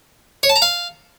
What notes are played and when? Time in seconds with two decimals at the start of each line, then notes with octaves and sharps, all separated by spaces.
0.43 C#5
0.49 A5
0.56 A#5
0.62 F5